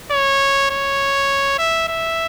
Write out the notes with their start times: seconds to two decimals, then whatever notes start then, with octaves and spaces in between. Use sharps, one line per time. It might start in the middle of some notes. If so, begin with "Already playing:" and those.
0.12 C#5
0.71 C#5
1.58 E5
1.88 E5